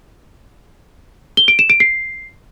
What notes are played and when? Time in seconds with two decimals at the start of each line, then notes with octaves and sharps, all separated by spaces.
1.37 G7
1.48 D7
1.59 E7
1.70 D7
1.80 C7